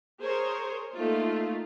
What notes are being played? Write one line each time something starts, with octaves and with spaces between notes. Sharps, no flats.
G#4 A#4 C5 C#5
A3 A#3 D#4 F4